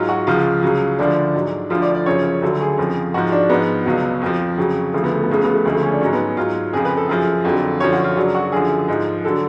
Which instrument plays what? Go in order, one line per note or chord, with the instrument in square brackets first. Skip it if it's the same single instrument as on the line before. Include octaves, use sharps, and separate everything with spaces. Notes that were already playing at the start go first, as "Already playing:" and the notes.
Already playing: [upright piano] G#2 F#3 F4
F#4
C#2 C#3 F3 F4
C#2 C#3 F#3
D2 D3 F3 D4
G#2 F#3
D2 D3 F3 F4
D5
D5
F#2 C#3 F3 C#5
C#5
D2 D3 F#3 A4
G#4
F2 C#3 F3
G#2 F3 F#4
D4
G#2 F3 B3
C#2 B2 F#3
F2 F3
F2 C#3 F#3
D2 C#3 F3 A3
B3
A3
B3
C#2 C#3 F3 A3
B3
A3
D2 C#3 F3 G#3
A3
C#4
D4
G#2 F#3 C#4
B3
G#2 F#3 F4
F2 C#3 F3 G#4
B4
A4
F#2 F3 G#4
F2 D3 F#3
F#2 D3 F3 C#5
F#4
F4
F#2 C#3 F#3 D4
F#4
F#2 D3 F3 G#4
G#2 F3
D3 F#3 A4